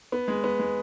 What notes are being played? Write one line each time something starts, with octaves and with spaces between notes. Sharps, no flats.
B3
G#3
B3
G#3